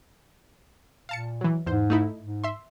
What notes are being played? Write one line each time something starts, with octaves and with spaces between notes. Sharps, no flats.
A#2 F5 A5 C#7
E3 F#3
E2 G#2 C5
A3 D#4 E4
G#2
E5 C6